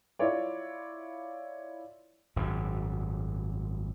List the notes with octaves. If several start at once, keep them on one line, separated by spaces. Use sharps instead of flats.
E4 F4 C#5 D5
G#1 F#2